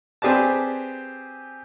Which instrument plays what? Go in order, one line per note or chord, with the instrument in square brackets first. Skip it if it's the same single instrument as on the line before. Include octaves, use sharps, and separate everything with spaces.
[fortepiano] C4 G4 G#4 B4 D5 A5